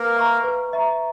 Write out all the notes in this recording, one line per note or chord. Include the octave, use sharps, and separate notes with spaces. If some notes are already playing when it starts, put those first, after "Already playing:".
Already playing: A#3 A#4 B4
E5 A#5 C#6
B4
E5 A#5 C#6